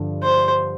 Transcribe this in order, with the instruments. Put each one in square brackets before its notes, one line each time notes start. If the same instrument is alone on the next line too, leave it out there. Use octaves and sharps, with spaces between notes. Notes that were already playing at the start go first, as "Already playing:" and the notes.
Already playing: [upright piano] G2 D3 F3
[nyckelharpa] C5